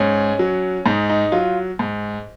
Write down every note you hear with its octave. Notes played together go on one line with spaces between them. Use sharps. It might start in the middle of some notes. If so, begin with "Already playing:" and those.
Already playing: G#2 C#4
F#3
G#2 D#4
D#4
F#3 F4
G#2